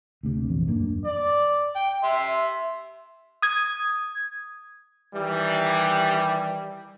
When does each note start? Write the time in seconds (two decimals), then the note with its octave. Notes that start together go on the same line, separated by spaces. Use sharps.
0.23 D2 C3
0.49 A#1 E2
0.68 F#2 A2 A#3 D4
1.05 D5
1.76 G5
2.04 E5 C6
3.42 D#6 G#6
5.14 D#3 E3 G3